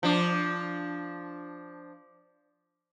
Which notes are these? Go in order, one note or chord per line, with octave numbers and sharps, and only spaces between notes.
F3 D4